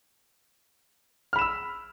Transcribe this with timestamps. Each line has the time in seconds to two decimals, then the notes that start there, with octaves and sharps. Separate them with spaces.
1.33 F6
1.36 B5
1.39 E7
1.41 E6